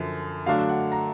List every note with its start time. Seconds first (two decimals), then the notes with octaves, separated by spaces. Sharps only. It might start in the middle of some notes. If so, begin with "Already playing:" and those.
Already playing: F#2 D3 F3
0.46 D3 F#3 A3 D4 F5
0.69 F#5
0.92 A#5